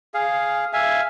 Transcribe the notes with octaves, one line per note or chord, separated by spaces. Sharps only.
G#4 F5
E5 F5 G#5